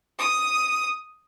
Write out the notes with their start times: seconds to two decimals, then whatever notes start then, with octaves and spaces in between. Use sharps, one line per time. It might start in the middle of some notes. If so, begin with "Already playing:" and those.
0.19 D#6